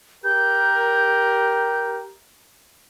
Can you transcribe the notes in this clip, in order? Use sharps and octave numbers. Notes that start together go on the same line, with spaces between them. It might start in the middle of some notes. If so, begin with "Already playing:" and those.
G4 A#4 G6